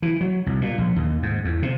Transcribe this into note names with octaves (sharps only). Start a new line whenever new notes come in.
E3
F#3
C2
A#2
A#1
D#2
G#2
E2
C3